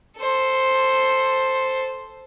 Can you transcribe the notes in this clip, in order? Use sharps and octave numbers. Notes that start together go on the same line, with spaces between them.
A4 C5